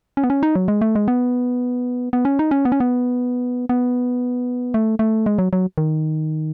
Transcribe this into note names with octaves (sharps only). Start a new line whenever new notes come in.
C#4
B3
C#4
D#4
F#3
G#3
A3
G#3
B3
B3
C#4
D#4
C#4
B3
C#4
B3
B3
A3
A3
G#3
F#3
F#3
D#3